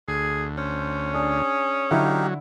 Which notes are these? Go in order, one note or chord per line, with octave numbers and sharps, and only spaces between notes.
D2 G#4
C#4 C5
D4 G#4
D3 F#3 D#4 E4 G4 A4 F5